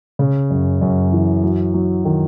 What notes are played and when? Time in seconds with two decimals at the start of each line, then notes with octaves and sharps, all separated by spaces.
0.19 C#3
0.50 F#2
0.81 F#2
1.12 E3
1.44 F#3
1.74 F#3
2.05 D#3